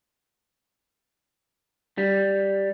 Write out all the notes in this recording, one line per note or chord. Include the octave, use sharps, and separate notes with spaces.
G3